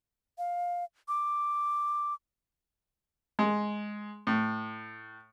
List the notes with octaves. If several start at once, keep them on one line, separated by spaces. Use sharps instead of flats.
F5
D6
G#3
A2